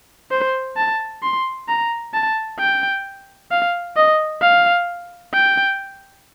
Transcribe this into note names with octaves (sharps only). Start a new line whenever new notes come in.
C5
A5
C6
A#5
A5
G5
F5
D#5
F5
G5